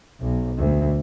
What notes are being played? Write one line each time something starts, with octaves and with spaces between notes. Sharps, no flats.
B1
D2